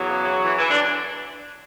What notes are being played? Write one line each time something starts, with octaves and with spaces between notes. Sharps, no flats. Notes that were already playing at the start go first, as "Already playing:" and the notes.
Already playing: E2 F#3
C#3
E3
E3
E3
D4